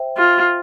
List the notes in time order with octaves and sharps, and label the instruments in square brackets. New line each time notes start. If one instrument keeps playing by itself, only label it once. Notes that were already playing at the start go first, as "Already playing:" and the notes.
Already playing: [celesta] C5 E5 G5
[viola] F4